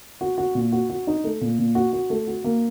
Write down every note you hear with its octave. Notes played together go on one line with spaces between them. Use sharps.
F#4
F#4
A#2
F#4
F#4
D#4
A3
A#2
A#2
F#4
F#4
A3
F#4
A#3